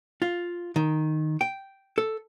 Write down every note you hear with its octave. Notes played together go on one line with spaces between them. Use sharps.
F4
D#3
G5
A4